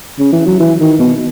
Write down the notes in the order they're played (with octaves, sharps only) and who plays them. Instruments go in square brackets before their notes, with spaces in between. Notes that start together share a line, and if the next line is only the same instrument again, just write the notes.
[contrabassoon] C#3
E3
F#3
E3
D#3
B2